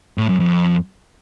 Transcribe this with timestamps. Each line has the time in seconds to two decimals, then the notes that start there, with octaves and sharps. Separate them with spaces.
0.18 A2
0.29 F#2
0.40 F2